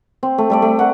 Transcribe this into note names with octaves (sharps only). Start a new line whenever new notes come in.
C4
A3
G3 A3 D5
A3
A#4 F#5